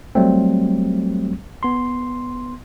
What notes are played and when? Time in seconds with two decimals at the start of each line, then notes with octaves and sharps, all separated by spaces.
0.15 F#3 G3 A3 C4
1.63 B3 C6